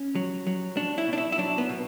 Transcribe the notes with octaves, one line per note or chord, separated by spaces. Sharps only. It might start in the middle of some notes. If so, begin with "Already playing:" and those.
Already playing: C#4
F#3
F#3
F#3 D4
E4
B2
D4
E4
E4
F#3 D4
B3
B2